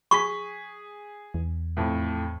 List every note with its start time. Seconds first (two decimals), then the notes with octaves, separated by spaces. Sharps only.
0.11 G#4 C#6 B6
1.34 E2
1.77 F2 A2